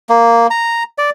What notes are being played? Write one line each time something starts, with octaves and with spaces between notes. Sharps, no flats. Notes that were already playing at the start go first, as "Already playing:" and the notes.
A#3
A#5
D5